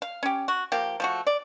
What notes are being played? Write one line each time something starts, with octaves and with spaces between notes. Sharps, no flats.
F5
C#4 G4
F#4
F3 A#3 G4
F3 A3 F#4
D5